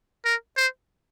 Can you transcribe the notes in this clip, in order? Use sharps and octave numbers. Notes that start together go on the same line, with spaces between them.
A#4
C5